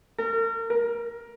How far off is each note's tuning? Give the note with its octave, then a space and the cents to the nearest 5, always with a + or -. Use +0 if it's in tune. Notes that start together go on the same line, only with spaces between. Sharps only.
A#4 -35
A#4 +15